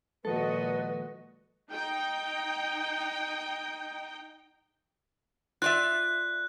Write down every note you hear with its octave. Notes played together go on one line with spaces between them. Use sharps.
A#2 D#3 F3 G#3 F#4 A4 B4 D#5
D#4 G5
F4 D5 E5 F#6